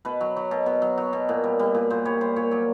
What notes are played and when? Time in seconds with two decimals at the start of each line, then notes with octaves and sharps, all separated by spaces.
0.05 B2 B4
0.21 F#3
0.36 F#3
0.51 B2
0.66 B2
0.82 F#3
0.98 F#3
1.13 B2
1.29 A#2
1.44 G3
1.59 G3
1.75 A#2
1.90 A#2 C5
2.05 G3 C#5
2.21 G3 C5
2.36 A#2 C#5
2.51 F#3 D5